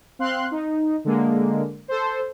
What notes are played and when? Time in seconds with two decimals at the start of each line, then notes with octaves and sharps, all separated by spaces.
0.19 C4 F5 C6 F#6
0.51 D#4
1.05 D3 G#3 A#3
1.88 A4 C5